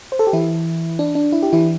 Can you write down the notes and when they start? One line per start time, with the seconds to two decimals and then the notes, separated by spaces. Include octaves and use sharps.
0.12 C5
0.19 A4
0.27 G4
0.33 E3 E4
0.99 D4
1.15 D4
1.32 E4
1.43 G4
1.53 E3 E4